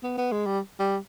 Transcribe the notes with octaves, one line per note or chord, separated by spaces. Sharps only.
B3
B3
G#3
G3
G3